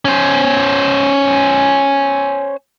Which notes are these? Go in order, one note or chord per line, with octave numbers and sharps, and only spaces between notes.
C#4 C5